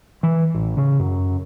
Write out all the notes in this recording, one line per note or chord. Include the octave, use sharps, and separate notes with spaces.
E3
A1
C#3
F#2